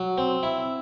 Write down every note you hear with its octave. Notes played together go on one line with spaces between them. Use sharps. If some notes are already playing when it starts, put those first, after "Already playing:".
Already playing: F#3
C4
E4